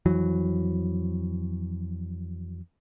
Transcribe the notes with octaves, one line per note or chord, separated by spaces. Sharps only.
F2 E3 F#3